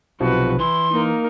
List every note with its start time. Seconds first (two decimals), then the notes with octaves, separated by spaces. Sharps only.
0.20 B1 C3 F3 F#4 B4
0.59 E3 E4 C6
0.92 A#3 D#4 A#4